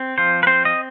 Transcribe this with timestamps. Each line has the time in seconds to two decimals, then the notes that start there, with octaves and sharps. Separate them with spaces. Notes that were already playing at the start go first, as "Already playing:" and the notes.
Already playing: C4
0.18 F3 C5
0.43 B4
0.47 C4 C5
0.65 D#5